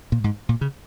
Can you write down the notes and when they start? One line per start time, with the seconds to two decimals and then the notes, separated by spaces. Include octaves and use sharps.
0.12 A#2
0.24 G#2
0.49 A#2
0.61 C#3